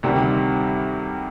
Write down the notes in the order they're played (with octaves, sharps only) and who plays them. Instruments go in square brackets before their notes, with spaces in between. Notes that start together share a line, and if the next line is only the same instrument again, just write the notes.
[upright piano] D2 C3 D#3 G3